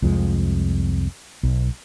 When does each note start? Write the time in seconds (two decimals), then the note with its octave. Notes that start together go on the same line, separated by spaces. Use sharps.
0.02 C2 F2 F3 G#3
1.43 B1